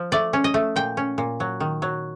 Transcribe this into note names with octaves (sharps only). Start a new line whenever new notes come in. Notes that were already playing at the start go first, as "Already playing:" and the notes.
Already playing: F3
A3 D5
C#4
D#5
A3
A#2 G5
C#4
A#2
F#3
D#3
F#3